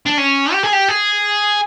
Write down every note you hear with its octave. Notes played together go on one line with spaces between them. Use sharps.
D4
C#4
G4
G#4
G4
G#4